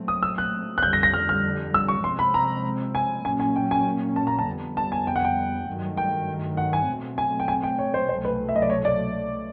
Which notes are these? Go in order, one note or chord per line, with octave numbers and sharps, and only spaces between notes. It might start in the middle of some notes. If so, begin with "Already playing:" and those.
Already playing: A#2 F#3 A3 C4
D#6
E6
F#6
F#6
F2 D3 G3 G6
A#6
A#6
F6
F6
E6
C#6
C3 F3 G#3 C4 C6
B5
A#5
G#5
A#2 F#3 A#3 C#4 G#5
G#5
G5
G#5
A5
A#5
A5
F2 D3 G3 B3
A5
G#5
G5
F#5
G5
G2 D#3 F#3 A3
G5
F#5
G#5
B2 F#3 A3 C4
G#5
G5
G#5
G5
C#5
C5
C2 B2 F#3 A3 C5
B4
E5
D#5
D5
C#5
D5